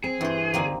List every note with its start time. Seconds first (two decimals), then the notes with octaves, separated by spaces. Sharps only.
0.04 C4 G#4
0.21 G2 E3 C5
0.54 D3 F#3 A#3 C4 D#4